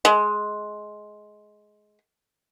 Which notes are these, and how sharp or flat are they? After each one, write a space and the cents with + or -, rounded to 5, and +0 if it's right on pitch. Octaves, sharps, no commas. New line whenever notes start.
G#3 +15